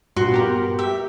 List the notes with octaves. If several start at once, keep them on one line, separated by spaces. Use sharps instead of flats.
G2 A#2 F#4 C6
B3 G4 A#4
G4 E5